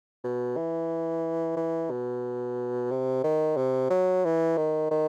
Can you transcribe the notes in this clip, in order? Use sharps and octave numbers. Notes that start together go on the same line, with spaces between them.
B2
E3
E3
B2
C3
D#3
C3
F#3
E3
D#3
D#3